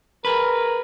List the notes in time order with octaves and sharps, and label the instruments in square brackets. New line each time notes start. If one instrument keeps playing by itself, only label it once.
[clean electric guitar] G#4 B4 [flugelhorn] A#4